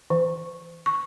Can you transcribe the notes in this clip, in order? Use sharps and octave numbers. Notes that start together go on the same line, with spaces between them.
E3
C#6